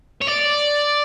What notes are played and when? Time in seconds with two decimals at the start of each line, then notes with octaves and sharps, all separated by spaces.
0.22 C#5
0.27 D5